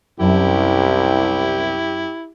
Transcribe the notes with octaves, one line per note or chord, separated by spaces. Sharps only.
C2 F#2 E4 G4 A5